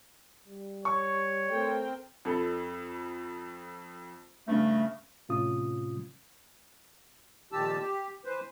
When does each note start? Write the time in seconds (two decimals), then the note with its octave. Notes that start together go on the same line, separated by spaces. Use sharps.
0.46 G3
0.85 C#5 C#6
1.50 A3 C4 A#4 G5
2.25 F2 A4 B5
4.48 G2 C#3 A3
5.29 A2 C3 C#4 F4 D#6
7.52 F2 A#2 D#3 G4 A5 E6
7.80 G4
8.25 E3 B4 C5